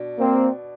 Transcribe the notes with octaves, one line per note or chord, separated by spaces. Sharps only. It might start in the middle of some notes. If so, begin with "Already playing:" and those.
Already playing: B2 D4
A#3 C4